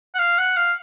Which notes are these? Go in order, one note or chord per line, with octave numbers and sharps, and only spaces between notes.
F#5
F5
F#5
F5